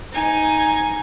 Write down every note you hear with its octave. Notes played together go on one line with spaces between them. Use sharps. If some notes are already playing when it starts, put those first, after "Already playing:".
D#4 G#5